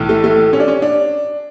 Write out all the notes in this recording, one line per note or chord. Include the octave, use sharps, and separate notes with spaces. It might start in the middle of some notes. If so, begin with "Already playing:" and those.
Already playing: B1 A2 E3
A3
A3
C#4
D4
C#4
D4